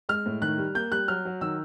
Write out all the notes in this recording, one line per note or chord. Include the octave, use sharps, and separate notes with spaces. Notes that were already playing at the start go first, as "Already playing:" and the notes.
G#3 F6
A2
D#3 F#6
G3
A#3 G6
G3 F#6
F#3 F6
F#3
D#3 E6